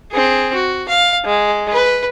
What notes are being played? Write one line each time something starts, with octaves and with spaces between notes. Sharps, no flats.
C4 G#4
F#4
F5
G#3
B4